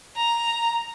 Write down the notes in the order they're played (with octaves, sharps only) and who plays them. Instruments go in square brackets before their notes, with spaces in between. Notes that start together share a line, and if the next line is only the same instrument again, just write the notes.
[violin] A#5